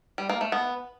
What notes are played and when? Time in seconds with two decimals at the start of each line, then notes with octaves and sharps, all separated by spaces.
0.18 G3
0.29 A#3
0.41 A3
0.52 B3